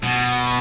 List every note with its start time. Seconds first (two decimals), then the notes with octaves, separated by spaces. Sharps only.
0.03 B2